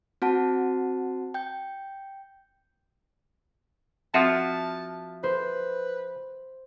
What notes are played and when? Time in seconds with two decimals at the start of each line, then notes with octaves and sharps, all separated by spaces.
0.22 C4 F#4 F#5 A5
1.34 G5 G6
4.14 F3 C4 F4 F#4 E5 F#5 A5 C6
5.24 B4 C5